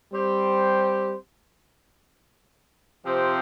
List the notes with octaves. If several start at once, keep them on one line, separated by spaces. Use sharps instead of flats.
G3 C4 G4 C5
C3 F3 C4 G4 C5